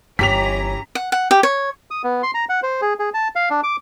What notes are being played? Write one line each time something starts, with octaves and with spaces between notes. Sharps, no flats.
G1 E3 C#4 G4 A#5 B6 F7
F#5
F#5
G4
C#5
D#6
B3
C6
A#5
F#5
C5
G#4
G#4
A5
F5
D4
D6